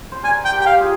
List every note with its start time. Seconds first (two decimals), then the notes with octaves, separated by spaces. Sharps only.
0.12 C5
0.23 A#4 D5 G#5
0.45 G5
0.52 G4 A#4
0.61 G5
0.66 F5
0.81 F4 G#4